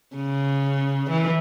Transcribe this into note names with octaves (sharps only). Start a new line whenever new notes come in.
C#3
E3